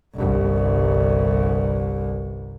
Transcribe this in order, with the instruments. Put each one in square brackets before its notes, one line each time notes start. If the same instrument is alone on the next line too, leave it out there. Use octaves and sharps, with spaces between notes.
[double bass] G1 C2